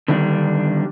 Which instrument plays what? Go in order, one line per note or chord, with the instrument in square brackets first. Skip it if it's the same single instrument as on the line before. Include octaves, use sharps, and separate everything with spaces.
[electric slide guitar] D3 D#3 G3 D4